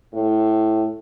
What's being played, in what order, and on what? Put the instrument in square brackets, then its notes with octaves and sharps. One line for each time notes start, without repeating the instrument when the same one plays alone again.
[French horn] A2